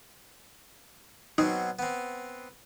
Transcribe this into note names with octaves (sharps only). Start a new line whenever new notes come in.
B2 F#3 C4 D#4
B3 C4